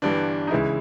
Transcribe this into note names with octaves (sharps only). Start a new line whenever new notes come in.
G1 G2 E3 D4
D#4
C#2 C#3 E3 G#3 E4